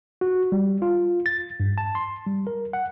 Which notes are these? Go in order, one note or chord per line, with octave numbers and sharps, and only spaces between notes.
F#4
G3
F4
A6
G2
A5
C6
G3
A#4
F#5